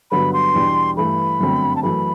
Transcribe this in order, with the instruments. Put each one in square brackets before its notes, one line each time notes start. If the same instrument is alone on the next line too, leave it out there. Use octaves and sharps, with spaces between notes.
[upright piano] G2 D3 F#3 B3 [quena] B5
[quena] C6
[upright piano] E2 B2 G3 D4
[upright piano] G2 E3 A3 [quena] B5
[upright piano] G1 F#2 D3 A3 C4
[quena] A5
[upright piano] F#2 E3 A3 E4 A4 [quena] B5